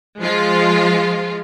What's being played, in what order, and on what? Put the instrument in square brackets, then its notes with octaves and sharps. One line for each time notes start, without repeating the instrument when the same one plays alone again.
[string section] F3 G#3 F4